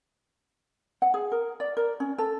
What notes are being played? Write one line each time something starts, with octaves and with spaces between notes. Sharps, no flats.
F#5
G#4
A#4
D5
A#4
C#4
A4